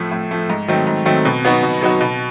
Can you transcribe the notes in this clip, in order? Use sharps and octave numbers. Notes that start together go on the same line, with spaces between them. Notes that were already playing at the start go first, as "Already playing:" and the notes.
Already playing: A2 F3 A3
A2
F3 A3
G#2
D#3 F#3 A3 C4
G#2
D#3 F#3 A3 C4
B2
F#3 B3 D#4 F#4
B2
F#3 B3 D#4 F#4
B2